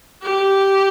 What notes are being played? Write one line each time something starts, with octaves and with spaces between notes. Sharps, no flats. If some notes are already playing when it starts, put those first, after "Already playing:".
G4